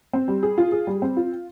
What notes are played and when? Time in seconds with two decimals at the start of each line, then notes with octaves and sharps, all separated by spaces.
0.13 C4
0.28 G3
0.43 G#4
0.58 F4
0.72 G#4
0.87 G3
1.02 C4
1.17 F4